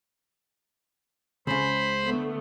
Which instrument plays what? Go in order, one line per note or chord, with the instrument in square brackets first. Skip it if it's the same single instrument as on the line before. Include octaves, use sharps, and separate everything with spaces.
[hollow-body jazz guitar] C#2 C#3 [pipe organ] C5 B5
[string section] D3 A3 B3